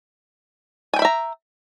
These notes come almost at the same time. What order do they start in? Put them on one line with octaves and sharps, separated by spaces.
G#5 G5 B5 E5 A#5